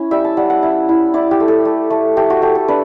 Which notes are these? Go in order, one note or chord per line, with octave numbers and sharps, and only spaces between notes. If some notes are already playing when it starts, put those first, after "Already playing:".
Already playing: C#4 E4
G3 E5
A5
G3 F#5
F#5
E4 E5
E4
E4 D5
G4
A3
A4
A3
A3
A3 G4
F#4
A3 G4
A4
D4 B4